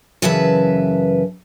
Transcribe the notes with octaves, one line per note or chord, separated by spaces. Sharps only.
F#2 C#3 E3 B4 E5 A5